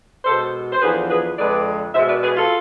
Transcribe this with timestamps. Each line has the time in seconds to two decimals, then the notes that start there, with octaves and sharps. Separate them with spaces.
0.25 B2 G#3 A4 C5
0.72 C5
0.81 E2 D3 F3 G#4 B4
1.10 G#4 B4
1.38 F2 D3 G#3 B4 D5
1.95 B2 C5 E5
1.98 G#3
2.08 B4 D5
2.23 G#4 B4
2.37 F4 A4